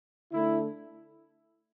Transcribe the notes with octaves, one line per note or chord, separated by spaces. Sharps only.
D3 A3 D4 E4